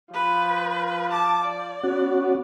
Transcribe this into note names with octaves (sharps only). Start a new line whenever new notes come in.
F3 B4
A5 D6
D5
B3 C#4 F#4